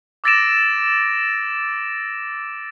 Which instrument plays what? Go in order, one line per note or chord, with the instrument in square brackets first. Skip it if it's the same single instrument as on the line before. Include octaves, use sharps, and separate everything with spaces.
[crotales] D6 E6 A6 A#6 D7 E7